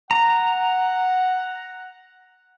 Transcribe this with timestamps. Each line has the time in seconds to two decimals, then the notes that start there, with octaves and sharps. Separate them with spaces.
0.11 F#5 A#5